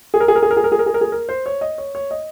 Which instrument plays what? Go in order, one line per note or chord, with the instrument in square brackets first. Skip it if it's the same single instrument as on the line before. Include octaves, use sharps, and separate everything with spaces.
[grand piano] G#4
A#4
G#4
A#4
G#4
A#4
G#4
A#4
G#4
A#4
G#4
A#4
G#4
A#4
C5
C#5
D#5
C#5
C#5
D#5